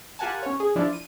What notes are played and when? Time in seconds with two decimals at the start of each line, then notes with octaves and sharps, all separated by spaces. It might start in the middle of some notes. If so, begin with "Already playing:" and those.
0.19 F4 G4 A#4 F#5 G#5 A5
0.43 C#4 C#5
0.60 G#4
0.76 F3 D4 E4 F4
0.93 D#7